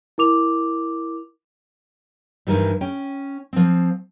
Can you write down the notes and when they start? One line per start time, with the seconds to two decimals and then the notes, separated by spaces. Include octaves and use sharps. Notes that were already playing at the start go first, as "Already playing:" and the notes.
0.18 E4 A#4 D6 F7
2.47 G2 A#2 D#3 E3 G3
2.81 C#4 G5
3.53 F3 C4